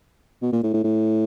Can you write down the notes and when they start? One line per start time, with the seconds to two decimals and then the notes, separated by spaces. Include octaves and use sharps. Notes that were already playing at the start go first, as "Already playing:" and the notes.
0.42 B2
0.52 A#2
0.63 A2
0.74 A2
0.84 A2